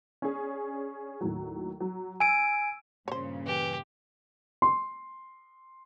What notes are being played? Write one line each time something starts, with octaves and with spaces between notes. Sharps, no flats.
C#4 D4 G#4
D#2 A2 F#3
F#3
G#5 E6 D7
G2 A#2 C#3 C5 C#5
E3 G4
C6